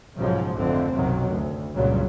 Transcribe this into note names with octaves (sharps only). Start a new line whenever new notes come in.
B1 G#2 C#3 F3 F#3 G#3
G#1 F2 D3 A3 C4
B1 F#2 C3 D#3 F#3
D2
C#2 G2 A#2 C#3 F#3 G3